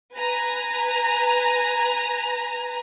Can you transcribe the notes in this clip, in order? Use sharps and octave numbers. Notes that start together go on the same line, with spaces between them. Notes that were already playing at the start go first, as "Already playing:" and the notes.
B4 G#5 A#5